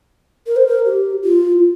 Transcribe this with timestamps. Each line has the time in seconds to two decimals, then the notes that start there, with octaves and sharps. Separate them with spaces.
0.46 A#4
0.56 C5
0.66 A#4
0.85 G4
1.24 F4